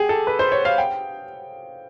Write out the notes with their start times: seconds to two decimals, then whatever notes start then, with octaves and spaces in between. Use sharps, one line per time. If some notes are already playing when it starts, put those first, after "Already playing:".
Already playing: G4 G#4
0.09 A4
0.27 B4
0.39 C5
0.52 C#5
0.65 F5
0.78 G5